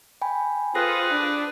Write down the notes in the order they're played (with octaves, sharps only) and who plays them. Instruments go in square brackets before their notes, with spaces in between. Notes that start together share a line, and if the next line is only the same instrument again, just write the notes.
[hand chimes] G5 G#5 B5
[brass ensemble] C4 F4 A4 [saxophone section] G#4 B4 [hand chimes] A#6
[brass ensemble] D4